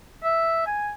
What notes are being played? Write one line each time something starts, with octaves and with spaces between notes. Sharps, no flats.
E5
G#5